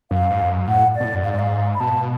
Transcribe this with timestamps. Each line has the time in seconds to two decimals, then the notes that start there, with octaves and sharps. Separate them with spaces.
0.11 F#2 F5
0.30 G#2
0.41 F2
0.49 F#2
0.67 A2 F#5
0.95 D5
1.00 B2
1.05 A2
1.14 F#2
1.24 G#2 F5
1.31 D5
1.39 F5
1.74 B5
1.80 B2 A5